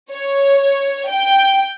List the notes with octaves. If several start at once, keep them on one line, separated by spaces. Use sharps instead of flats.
C#5
G5